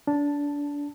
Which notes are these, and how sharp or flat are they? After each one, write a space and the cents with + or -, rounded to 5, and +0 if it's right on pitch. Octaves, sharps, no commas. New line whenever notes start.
D4 -25 A5 +0